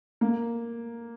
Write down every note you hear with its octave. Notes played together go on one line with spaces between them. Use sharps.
A#3